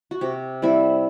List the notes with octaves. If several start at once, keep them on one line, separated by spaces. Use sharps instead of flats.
F#4
C3 G4
G3 C4 E4